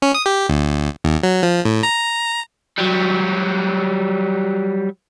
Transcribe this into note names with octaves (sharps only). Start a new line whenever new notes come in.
C#4
D#6
G4
D2
D#2
F#3
F3
A2
A#5
F#3 G3